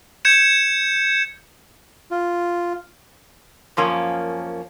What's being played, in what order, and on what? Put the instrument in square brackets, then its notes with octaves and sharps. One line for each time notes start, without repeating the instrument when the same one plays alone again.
[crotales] G6 G#6 C#7 E7
[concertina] F4
[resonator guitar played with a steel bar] F#2 F3 A#3 C#4